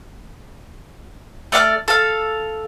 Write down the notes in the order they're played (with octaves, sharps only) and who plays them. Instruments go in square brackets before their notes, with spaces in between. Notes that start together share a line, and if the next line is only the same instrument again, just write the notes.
[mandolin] A3 D5 F5 F6
A4 F5